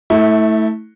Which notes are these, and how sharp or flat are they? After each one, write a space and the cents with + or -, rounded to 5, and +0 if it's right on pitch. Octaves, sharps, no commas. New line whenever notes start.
A3 +0 E4 -25